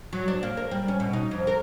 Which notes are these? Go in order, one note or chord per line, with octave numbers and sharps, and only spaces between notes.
F#3
D4
A#3
A#4
G3
C#4
B2
D#4
F2
A#4